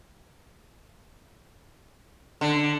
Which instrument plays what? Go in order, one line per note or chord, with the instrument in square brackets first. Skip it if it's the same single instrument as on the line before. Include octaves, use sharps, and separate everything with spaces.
[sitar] D3